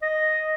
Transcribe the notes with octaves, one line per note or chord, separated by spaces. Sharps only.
D#5